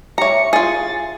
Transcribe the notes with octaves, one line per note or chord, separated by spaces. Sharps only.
G4 C#5 E5 A#5 C#7
F4 G#4 A6